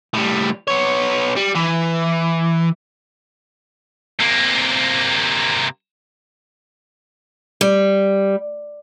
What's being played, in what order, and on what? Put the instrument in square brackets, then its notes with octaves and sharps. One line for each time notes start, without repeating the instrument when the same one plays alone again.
[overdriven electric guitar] A2 G3
B3 C#5
G3
E3
[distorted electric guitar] C3 A#3
[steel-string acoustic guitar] G3